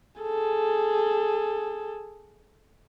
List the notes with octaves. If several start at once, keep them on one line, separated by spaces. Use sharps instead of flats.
G#4 A4